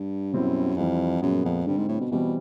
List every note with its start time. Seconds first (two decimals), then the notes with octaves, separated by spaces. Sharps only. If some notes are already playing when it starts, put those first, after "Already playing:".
Already playing: G2
0.33 F#2 B2 G3 C4 E4
0.77 F2 E3 G3 C4 E4
1.22 F#2 A#2 F3 G#3 B3
1.45 F2
1.66 G2 D3 G3 C4
1.77 G#2
1.88 A2
2.00 B2
2.11 B2 E3 G3 C4